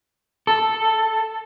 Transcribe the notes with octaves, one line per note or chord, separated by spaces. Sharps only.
A4